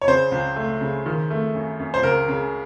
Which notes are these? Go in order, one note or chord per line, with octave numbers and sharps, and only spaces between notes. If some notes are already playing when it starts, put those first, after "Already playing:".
C#5
C#3 C5
C#2
A3
C#3
D#3
A3
F#2
F#2
C5
C#2 A#4
C#3